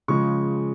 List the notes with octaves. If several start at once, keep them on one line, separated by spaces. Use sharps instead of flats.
C#3 F3 G#3 C#6